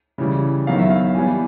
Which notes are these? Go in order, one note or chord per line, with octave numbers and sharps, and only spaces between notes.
C#3 E3 G3
D#3 F#3 B3 F5
E5
F5
E3 G3 B3 G#5